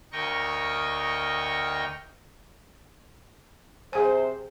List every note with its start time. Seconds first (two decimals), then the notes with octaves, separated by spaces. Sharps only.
0.12 D2 A#4 D#5 G5 C#6
3.93 C3 G#4 C5 G#5